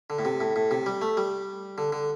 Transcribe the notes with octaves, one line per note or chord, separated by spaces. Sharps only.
D3
A2
C3
A2
A2
C3
G3
A3
G3
D3
D3